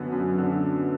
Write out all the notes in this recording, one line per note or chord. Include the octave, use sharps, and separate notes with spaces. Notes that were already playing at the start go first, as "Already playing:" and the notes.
Already playing: F#2 D3 B3
F#2
D3